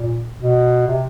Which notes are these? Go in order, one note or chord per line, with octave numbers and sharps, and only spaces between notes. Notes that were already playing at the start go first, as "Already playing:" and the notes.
Already playing: A#2
B2
C3